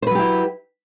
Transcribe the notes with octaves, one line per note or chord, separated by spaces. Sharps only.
F#3 E4 G4 B4 C5